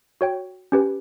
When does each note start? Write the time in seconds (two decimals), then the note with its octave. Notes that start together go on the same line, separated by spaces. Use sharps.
0.21 F#4 C#5 G5
0.72 C#4 G4 B4